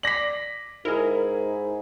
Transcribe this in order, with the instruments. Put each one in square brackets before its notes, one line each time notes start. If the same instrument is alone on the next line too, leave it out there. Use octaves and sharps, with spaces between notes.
[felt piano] D5 D6 B6 [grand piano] A#6 F#7
[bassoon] G#2 [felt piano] E4 G#4 [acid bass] A#4